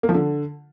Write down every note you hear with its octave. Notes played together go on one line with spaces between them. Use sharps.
A#3
F3
D3